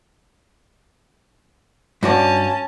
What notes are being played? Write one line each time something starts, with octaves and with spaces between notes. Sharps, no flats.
G2 C#4 F#4 D5 A5